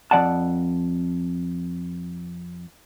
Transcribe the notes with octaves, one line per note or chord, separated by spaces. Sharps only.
F2 D5 F#5 A5